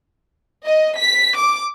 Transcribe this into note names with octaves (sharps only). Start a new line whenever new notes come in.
D#5
B6
D6